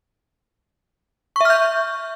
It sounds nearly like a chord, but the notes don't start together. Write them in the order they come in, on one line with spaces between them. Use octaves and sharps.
C#6 E5 F6 G6